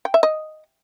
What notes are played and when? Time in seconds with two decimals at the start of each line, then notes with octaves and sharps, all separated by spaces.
0.05 G5
0.14 E5
0.23 D#5